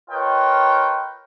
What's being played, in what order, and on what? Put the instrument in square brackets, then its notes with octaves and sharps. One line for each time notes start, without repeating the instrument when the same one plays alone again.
[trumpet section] F4 A#4 B4 C#5 D#5 G5